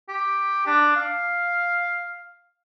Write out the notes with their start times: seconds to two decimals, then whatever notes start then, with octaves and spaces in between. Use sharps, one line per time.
0.09 G4
0.66 D4
0.96 F5